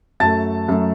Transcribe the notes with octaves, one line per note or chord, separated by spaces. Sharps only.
F#2 F#3 A3 A5 A6
F#2 F#3 A3